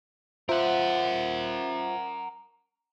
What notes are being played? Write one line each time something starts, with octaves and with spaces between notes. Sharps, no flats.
F4 A#4 C5 E5 F#5